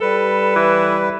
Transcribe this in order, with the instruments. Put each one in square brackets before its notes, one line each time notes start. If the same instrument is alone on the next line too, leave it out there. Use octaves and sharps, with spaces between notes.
[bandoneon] G3 B4 [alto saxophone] A4
[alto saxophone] E3